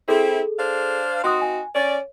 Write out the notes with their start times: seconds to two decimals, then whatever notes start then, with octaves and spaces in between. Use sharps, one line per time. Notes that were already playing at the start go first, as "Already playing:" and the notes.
0.09 C4 E4 G#4 A4
0.58 D4 C5 F5
1.24 C4 D#4 F#4 C6 D#6
1.41 G#5
1.75 C#4 C#5 D5